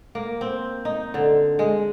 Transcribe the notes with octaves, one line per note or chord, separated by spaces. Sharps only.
A#3
C4
D#4
D3
G#3